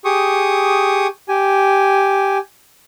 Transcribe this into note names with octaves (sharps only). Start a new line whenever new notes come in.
G4 G#4 C#6 D#6
G4 G#5